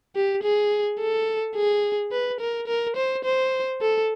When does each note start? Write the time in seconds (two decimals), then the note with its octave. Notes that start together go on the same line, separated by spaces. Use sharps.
0.15 G4
0.43 G#4
1.00 A4
1.55 G#4
2.12 B4
2.40 A#4
2.67 A#4
2.96 C5
3.24 C5
3.81 A4